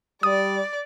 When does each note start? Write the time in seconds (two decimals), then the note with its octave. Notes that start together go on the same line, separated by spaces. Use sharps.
0.23 G3 D5 D#6